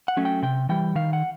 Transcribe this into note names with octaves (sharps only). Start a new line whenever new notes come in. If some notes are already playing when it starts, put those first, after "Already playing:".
F#5
F#3 A3 C#4
G5
C3 G5
E3 G3 G5
D#3 F5
F#5